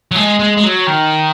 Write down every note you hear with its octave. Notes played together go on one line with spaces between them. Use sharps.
F#3
G#3
G#3
G#3
F#3
D#3